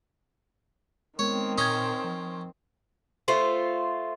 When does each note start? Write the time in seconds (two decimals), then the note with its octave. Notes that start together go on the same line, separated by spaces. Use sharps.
1.19 D#3 G#3 B3 C4 A#4 C#5
1.58 A#2 C#4 C5 A#5 D#6 G#6
2.04 F3
3.28 A3 F4 C5